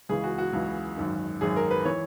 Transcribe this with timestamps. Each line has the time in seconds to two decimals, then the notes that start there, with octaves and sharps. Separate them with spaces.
0.09 C#2 C#3 E3 G#4
0.24 F#4
0.38 F#4
0.53 C#2 C#3 E3
0.97 G#1 F#2 D#3
1.41 G#1 F#2 D#3 G#4
1.56 A#4
1.71 B4
1.85 E3 C#5